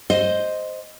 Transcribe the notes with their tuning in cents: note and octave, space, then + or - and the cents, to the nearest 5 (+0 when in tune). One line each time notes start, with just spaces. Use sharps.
C5 +0 D#5 +0